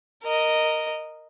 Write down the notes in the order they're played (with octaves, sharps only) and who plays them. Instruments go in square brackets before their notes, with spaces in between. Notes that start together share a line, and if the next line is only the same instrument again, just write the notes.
[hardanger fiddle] A#4 D#5